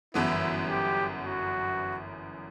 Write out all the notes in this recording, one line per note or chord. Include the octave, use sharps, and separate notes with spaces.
G1 F#2 E3 B3 E4
G4
F#4